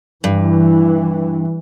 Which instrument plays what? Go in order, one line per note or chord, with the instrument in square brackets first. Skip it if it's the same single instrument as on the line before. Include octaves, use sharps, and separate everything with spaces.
[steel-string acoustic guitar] G2 [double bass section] E3